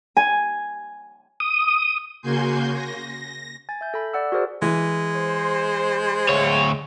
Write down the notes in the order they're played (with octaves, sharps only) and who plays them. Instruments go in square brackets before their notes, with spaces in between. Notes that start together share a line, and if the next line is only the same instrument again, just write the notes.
[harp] G#5
[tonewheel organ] D#6
[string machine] C#3 A#3 F#4 G#5 C6 G6
A#6
[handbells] G#5 A6
E5 G6
A4 B5
D5 F#5 E6
F#4 G#4 A#4 C5 D5
[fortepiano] E3 [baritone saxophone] G#3
[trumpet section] C5
[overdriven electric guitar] D2 C#5